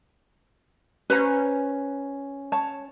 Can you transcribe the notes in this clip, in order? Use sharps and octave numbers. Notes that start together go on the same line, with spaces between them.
C#4 B4 C5 A#5
C#5 A5